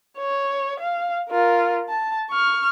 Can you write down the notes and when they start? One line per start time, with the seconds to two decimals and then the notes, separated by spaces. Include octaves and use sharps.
0.18 C#5
0.80 F5
1.30 F4 A#4
1.89 A5
2.30 C#6 F6